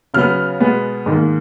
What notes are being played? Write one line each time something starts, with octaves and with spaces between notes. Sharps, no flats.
C#3 F#3 B3 F6
B2 G#3 B3
G#2 D#3 A#3